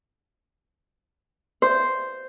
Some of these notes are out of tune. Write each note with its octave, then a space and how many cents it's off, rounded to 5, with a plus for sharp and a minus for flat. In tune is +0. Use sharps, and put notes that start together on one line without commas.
C5 -5